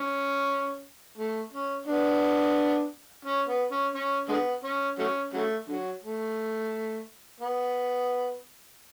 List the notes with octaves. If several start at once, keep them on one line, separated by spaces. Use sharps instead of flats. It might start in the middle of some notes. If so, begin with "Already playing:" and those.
Already playing: C#4
A3
C#4
B3 D4
C#4
B3
C#4
C#4
D3 G#3 B3
C#4
F#3 A3 C#4
C#3 F#3 A3
D3 F#3
A3
B3